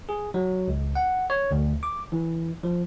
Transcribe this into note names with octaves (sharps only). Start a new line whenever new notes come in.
G#4
F#3
C#2
F#5
C#5
D2
D6
E3
F3